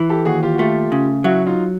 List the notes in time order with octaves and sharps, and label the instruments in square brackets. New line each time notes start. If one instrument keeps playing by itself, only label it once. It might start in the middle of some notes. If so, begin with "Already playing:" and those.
Already playing: [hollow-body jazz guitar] E3
[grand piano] G4 A4
[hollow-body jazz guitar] D#2 [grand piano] F#4 G#4
[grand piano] F4 G4
F#4
[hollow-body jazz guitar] A3 [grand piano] F4 G4
[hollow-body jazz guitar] C#3
[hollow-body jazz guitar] F#3 [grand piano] E4 F#4
[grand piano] D#4 F4